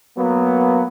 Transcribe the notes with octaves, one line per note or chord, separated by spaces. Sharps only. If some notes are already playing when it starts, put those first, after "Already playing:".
F#3 A#3 B3